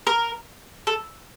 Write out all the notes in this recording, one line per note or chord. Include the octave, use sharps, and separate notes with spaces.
A#4
A4